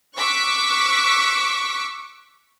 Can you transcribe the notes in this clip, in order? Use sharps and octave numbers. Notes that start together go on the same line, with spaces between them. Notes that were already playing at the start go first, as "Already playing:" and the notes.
C#6 D6 E6 F#6 B6